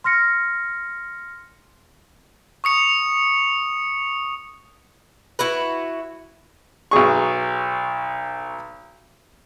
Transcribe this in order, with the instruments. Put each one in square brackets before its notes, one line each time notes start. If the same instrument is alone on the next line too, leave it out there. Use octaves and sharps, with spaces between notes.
[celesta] C6 F6 A#6 C#7
[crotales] C#6 D#6 C#7 F7
[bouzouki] E4 F#4 B4
[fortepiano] B1 F#3 G#4 C#6